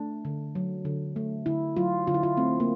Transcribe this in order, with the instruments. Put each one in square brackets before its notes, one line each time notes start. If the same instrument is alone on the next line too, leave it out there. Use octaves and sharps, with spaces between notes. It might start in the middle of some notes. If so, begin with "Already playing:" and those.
Already playing: [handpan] A3 D4
D3
F#3
D3
A3
D3 E4
F#3 F4
D3 F4
E4
F4
A3 C4
A#3